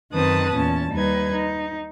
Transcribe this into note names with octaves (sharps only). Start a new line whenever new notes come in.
F#2 D#3 C4 B4 A5 D#6
E2 A#2 C#4 A5
D#2 G3 D#4 B4 G#6
D#4